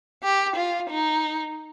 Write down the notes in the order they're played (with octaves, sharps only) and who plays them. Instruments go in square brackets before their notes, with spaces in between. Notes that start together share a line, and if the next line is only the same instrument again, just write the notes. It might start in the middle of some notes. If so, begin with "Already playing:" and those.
[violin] G4
F4
D#4